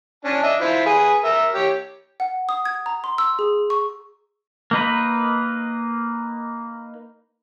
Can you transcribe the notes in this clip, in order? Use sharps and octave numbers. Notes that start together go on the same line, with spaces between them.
C#4 D4 A5
D4 D#5 E5
E4 F4 C5
G#4 B4
A#4 E5
G4 C#5
F#5
D#6
G#6
A#5
C6
E6
G#4
C#6
A#3 D#4 B4